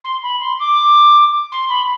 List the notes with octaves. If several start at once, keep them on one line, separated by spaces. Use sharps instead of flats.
C6
B5
C6
D6
C6
B5